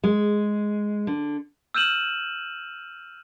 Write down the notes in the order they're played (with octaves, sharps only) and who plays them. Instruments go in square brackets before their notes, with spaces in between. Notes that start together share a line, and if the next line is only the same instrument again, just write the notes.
[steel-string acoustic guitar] G#3
D3
[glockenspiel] E6 F6 G6 D#7 E7 F#7